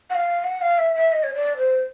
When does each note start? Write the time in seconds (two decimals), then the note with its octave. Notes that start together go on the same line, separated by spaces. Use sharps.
0.10 F#5
0.15 F5
0.44 F#5
0.62 F5
0.79 E5
0.95 E5
1.12 D#5
1.24 C#5
1.35 D5
1.57 C5